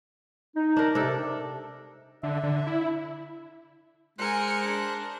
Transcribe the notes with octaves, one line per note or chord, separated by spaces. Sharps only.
D#4
D4 A#4
C3 D4 A4
D3 E5
D3
E4
G#3 A#4 C5 G#5 F#6 C#7
D4